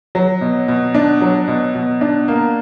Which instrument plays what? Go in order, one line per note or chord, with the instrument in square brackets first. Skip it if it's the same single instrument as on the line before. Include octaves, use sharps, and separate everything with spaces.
[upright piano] F#3
B2
B2
D4
F#3
B2
B2
D4
A#3